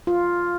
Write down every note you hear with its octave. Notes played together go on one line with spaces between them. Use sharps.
F4